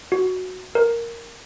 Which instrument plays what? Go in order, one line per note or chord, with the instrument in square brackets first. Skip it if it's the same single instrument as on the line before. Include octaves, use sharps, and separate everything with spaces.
[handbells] F#4
A#4